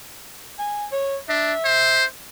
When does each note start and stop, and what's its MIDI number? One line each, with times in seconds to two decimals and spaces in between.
0.59 0.86 80
0.92 1.17 73
1.29 1.53 62
1.29 2.04 76
1.65 2.05 72